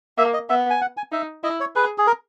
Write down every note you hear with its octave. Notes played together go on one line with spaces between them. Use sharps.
A#3 E5
D#5
B3 E5
G#5
F#5
G#5
D#4 E5
E4 D#5
C#5
G#4 B4
G#4
A#4